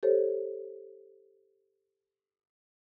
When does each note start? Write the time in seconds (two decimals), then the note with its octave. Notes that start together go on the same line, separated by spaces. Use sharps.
0.03 G4 A4 C5 C#5